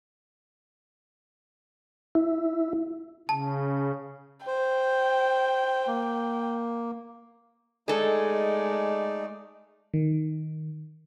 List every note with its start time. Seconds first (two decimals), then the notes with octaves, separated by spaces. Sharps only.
2.15 E4
3.29 C#3 A5
4.47 C5 G5
5.87 A#3
7.88 G#3 A3 D#4 G#4 A4 D5
9.94 D#3